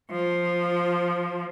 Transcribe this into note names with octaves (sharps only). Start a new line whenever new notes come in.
F3